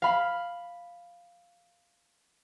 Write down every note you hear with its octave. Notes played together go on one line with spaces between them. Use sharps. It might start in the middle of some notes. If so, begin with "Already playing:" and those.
F5 B5